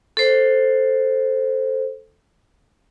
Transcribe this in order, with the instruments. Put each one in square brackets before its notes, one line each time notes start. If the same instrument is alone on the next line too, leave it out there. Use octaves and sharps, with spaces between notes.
[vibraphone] A4 C5